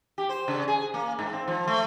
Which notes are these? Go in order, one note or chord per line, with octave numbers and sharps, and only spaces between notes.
G4
C5
C#3
G#4
A#3
G#2
C4
F3
A3